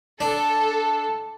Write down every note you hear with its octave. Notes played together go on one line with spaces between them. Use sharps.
D4 A4